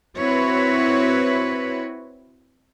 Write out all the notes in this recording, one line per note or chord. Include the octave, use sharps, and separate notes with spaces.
C4 E4 F#4 B4 C#5